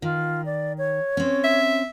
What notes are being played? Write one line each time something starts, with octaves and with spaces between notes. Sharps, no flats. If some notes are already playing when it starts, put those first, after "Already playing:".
D#3 F4
D5
C#5
C4 C#4
E5